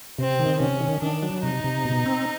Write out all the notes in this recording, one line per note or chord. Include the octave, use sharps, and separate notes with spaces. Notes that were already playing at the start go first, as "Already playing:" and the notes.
C3 C4
D#3
C3 C#4
D#3
D#3 D4
F#3
C3 D#4
C3
B2
C4